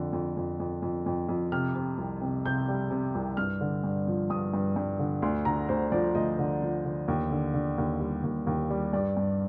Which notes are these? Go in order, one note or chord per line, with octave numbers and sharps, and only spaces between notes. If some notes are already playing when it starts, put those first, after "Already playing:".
Already playing: F2 D3
F2
F2
F2
F2
F2
F2
C3 F6
C3
C2
C3
C3 G6
G3
C3
C2
G2 F6
D3
G2
F3
G2 D#6
G2
G2
D3
D2 C6
D3 A#5
D2 C5
F3 D5
D2 D#5
D3
F3
D3
D#2
D3
D3
D#2
G3
D#2
D#2
G3
G2 D5
G2